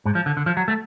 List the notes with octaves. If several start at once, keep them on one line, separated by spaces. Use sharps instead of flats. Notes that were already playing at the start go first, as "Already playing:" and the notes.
G#2
F3
D3
D3
F3
F#3
A3